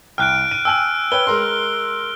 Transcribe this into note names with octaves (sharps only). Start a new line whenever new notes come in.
C2 G5 F6 F#6 D7
D#7
G5 G#5 E6 F#7
B4 C#5 G5 G7
G#3 A#4 C6